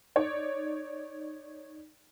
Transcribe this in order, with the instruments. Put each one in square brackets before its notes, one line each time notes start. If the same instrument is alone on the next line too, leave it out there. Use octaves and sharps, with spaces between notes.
[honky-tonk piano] D#4 C#5 D5